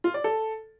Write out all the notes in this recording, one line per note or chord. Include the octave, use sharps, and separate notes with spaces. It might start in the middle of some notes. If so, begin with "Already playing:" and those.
F4
D5
A4